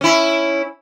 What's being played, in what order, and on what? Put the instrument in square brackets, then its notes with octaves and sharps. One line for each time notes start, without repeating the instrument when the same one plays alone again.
[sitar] C#4 E4